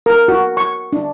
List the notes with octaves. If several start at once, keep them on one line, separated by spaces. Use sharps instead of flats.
A#4
F#4
C#6
D4